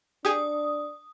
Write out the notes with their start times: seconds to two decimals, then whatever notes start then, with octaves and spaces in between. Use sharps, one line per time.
0.25 D4 G4 G#4 D#6